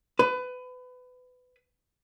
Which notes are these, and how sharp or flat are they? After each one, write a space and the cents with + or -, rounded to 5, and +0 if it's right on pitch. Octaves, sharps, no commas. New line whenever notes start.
B4 +25